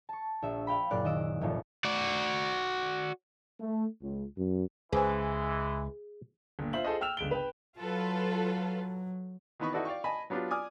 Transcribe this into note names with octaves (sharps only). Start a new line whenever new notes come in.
A5 C#6
A#1 E5
F5 G5 B5
F#1 A#2 D5 F#6
D#3 D#5 E6 D7
F1 C2 A#2 F3
F#4 D5
A3
C#2
F#2
C#2 E3 G#3 G#4 B4 C5 G#5
G1 A#2
F4 C5 E5 F#7
F4 G#4 A4 C5 D#5
G5 E6 F6 E7 F7
G1 C#2 D7 G7
B4 G5
F#3 F4 A4 B4
D#3 E3 B3 D#5 B5 C#6
D#4 E4 F#4 A4 B4 D5
D5 F5 G5 C#6
D#5 G#5 A5 B5
F#3 B3 D4 F4 G4
D5 G#5 D6 D#6 F6